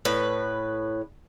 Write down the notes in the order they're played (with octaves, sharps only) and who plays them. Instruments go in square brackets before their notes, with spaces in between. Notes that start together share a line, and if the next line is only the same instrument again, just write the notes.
[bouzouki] A2 B4